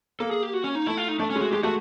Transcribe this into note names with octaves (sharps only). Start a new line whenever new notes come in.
A#3 A4
G#4
G4
F#4
C#4
D#4
A3 E4
F4
D#4
A3 D4
C#4
G#3
F#4
G#3 G4
A3 F#4